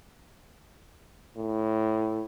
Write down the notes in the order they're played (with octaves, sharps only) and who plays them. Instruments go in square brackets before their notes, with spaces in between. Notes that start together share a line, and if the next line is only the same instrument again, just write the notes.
[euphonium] A2